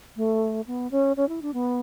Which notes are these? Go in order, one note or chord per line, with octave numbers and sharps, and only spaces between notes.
A3
B3
C#4
C#4
E4
D4
B3